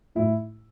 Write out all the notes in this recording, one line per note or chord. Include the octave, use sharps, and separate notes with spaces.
A2 E4